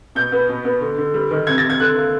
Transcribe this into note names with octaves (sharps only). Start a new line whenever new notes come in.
B2 G6
B3
B2
B3
D3
D3
G3
D#3
C3 G#6
A6
C3
G#6
D3 F#6
A#3